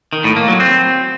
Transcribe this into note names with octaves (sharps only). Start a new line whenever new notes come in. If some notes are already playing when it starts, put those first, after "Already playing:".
D#3
A2
A#3
F#3
C4